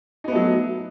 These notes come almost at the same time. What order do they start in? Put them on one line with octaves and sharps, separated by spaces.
D#4 B3 A3 F#3